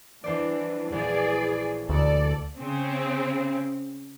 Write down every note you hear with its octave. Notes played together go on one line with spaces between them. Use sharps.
E2 E3 D4 C5 D5
A#1 E2 G#4 D5
D2 A4 D5
C#3 C4